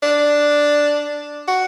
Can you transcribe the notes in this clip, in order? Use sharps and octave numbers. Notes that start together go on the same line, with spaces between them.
D4
F#4